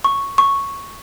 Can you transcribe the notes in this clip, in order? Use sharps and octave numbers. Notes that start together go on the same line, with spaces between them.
C#6
C#6